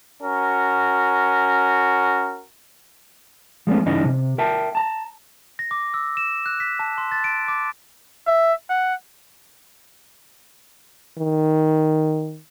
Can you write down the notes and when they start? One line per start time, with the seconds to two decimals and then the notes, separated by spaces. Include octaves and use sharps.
0.22 C#4 F#4 A#4
3.67 F3 G#3 A3 B3 C#4
3.86 C#2 G2 E3 C#4 D#4 D#5
4.05 C3
4.38 A#4 E5 G5 A5
4.75 A5 A#5
5.59 A#6
5.71 D6
5.94 E6
6.17 E7
6.46 F#6
6.60 B6
6.79 A5
6.98 C6
7.12 A6
7.24 D7
7.48 D6
8.27 E5
8.70 F#5
11.19 D#3